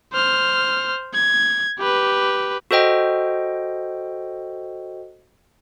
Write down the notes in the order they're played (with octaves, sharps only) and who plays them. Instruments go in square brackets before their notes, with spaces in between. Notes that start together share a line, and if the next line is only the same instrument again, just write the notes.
[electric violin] C5 F6
G#6
G4 B4
[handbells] F#4 A4 C5 D#5 G5